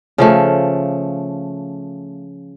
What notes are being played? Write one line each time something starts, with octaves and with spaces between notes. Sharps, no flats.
C#3 F3 A3